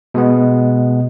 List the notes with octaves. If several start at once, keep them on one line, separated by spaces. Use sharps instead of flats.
B2 G#3 B3